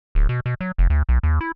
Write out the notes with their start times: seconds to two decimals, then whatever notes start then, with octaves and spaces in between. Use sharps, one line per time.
0.15 D1
0.29 B2
0.46 B2
0.61 F#3
0.78 F1
0.90 D2
1.09 B1
1.23 D#2
1.41 E4